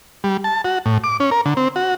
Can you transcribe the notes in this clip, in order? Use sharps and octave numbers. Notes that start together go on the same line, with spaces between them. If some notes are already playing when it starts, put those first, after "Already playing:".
G3
A5
F#4
A2
D6
C#4
A#4
D3
C4
F#4